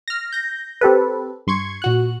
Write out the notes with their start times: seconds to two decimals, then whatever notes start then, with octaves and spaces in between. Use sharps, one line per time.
0.08 F6 A#6
0.32 G6 A#6
0.81 C4 G4 A4 B4
1.47 G2 C6 C#6 G#6
1.82 A#2 F#4 F#6